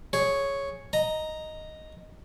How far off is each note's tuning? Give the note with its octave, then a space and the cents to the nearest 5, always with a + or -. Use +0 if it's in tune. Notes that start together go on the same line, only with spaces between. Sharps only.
G#4 +0 C#5 +0
D#5 +0 A#5 +0